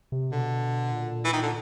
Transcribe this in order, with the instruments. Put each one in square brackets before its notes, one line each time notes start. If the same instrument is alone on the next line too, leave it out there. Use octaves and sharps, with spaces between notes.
[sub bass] C3
[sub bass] B2 [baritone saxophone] D3
[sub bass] A#2
[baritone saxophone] E3
D#3
D3